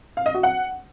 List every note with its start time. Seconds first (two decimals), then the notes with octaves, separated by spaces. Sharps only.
0.17 F5
0.26 D#5
0.35 F#4
0.43 F#5